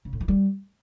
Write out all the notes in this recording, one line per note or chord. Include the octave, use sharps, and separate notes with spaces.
C#3
A2
E3
G3